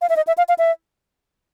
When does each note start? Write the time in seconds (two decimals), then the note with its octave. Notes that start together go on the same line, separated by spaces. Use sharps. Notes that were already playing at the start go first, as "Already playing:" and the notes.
0.01 F5
0.10 E5
0.17 D#5
0.27 E5
0.38 F5
0.49 F5
0.59 E5